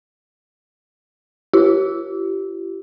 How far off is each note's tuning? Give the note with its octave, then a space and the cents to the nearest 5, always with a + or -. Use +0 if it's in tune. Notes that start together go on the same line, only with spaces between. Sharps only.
E4 +45 G4 -25